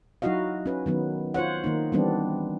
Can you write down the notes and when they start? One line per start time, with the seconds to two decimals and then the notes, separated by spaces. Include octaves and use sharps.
0.22 F#3 D#4 E4 F#4 D#5 F5
0.66 C#4 B4
0.86 D#3 F#3 B3
1.34 F4 C5 C#5 F#5
1.64 D#3 A#3 D#4
1.92 E3 G3 B3 C4 D4